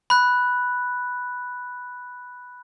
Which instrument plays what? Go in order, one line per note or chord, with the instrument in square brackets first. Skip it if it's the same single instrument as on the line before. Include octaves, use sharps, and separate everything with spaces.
[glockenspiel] B5 F#6